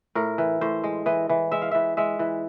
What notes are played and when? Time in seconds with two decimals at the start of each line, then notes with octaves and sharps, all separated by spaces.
0.15 A2 A#4
0.38 E3
0.61 A2 C5
0.84 G#3
1.06 E3 D#5
1.29 E3
1.52 G#3 E5
1.62 F5
1.71 E3 E5
1.97 G#3 E5
2.19 E3